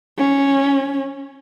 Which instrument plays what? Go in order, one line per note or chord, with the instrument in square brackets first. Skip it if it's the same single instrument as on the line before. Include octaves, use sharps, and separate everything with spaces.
[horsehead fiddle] C#4